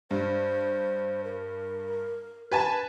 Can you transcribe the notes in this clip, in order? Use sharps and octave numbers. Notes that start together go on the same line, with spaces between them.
G2 C5
A#4
B4 G#5 A5